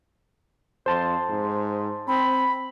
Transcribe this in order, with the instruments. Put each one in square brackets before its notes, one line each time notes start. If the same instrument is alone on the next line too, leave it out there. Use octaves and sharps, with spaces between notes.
[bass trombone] F2 [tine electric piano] C5 A5 C6
[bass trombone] G#2
[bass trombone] C4 [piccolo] B5